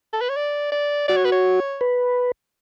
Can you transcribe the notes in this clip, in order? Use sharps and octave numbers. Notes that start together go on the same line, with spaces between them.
A4
B4
C#5
D5
D5
F#4 D5
C#5
B4
C#5
B4